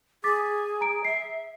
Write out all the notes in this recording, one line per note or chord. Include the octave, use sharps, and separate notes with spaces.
G#4 D6 A6 B6
A#5 D7
E5 C7